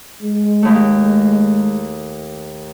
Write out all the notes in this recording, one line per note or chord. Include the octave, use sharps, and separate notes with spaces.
G#3
D#2 A3